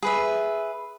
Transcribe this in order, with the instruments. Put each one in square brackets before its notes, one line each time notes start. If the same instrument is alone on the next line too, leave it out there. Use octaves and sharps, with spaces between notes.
[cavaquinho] G#4 B4 E5